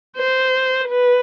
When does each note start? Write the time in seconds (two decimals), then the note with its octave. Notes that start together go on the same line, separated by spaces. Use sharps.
0.18 C5
0.88 B4